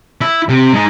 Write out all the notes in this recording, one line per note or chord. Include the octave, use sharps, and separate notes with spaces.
E4
C3
G#3 D#4